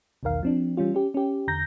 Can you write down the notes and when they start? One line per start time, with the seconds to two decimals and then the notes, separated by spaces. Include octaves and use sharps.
0.23 B1 E2 D#3 A#4 F5
0.43 F3 C4 D4
0.77 E3 G3 C#4 F4
0.94 C#4 G4
1.14 C#4 G4
1.47 E2 D3 A#5 G6 A#6